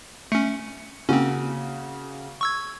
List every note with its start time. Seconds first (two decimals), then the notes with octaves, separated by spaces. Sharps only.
0.32 A3 C#4 C#7
1.09 C#3 A#3 C4 C#4 F#4
2.41 C#6 E6 G#6